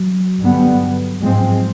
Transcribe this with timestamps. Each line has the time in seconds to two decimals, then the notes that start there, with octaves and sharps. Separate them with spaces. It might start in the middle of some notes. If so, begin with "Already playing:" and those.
Already playing: F#3
0.40 G2 D3 G3 B3
1.19 G#2 F3 F#3 G#3 C4